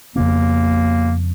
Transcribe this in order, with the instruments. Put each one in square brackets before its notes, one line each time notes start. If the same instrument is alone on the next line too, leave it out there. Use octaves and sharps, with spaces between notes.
[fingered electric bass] F2 C#3 B3 [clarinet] A#3